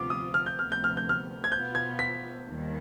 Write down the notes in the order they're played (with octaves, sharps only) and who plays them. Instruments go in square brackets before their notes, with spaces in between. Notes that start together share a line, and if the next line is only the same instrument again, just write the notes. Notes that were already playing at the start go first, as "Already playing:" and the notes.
Already playing: [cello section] D2 C3 F3 B3 F4 [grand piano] D6
[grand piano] D#6
F6
G6
[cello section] D2 C3 F3 B3 [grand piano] F6
[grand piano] G6
F6
G6
F6
G#6
[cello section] B2 B3 F4 [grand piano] G6
[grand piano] G#6
B6
[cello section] D#2 D#3 G3